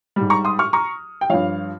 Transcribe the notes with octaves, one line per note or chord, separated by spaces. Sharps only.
G#2 G3
A#5 C#6
C6 D#6
C#6 F6
A#5 C#6
G5
G2 F3 C#5 F5